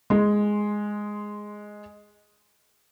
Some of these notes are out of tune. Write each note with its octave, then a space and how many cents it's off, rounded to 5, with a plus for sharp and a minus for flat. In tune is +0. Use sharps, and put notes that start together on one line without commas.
G#3 +0 C6 +0